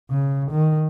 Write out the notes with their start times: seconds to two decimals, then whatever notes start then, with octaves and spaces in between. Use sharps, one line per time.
0.11 C#3
0.52 D#3